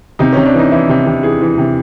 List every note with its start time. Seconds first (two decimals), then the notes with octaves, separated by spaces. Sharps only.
0.19 C3 D#4
0.33 C3 C#4
0.46 D4
0.54 E3 D#4
0.72 E3 E4
0.89 C3
1.07 C3
1.23 E3 G#4
1.41 E3
1.58 C3